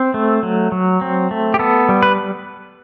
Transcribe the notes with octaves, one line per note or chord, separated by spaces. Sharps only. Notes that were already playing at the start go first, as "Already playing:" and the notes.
Already playing: C4
A3
F#3
F#3
C4
A3
G4
B3 A4
G3
B4